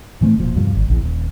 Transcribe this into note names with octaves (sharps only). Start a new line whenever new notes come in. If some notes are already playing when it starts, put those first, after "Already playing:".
A2 E3 A3 C4
E1 A#2 F3
E2 G2 C3 F3
G#1
A#1 E2
D#1